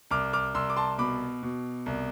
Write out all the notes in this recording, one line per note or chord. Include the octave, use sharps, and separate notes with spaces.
C2 D6 F6
D6 F6
C2 C6 E6
D6
A5 C6
B2 B5 D6
B2
C2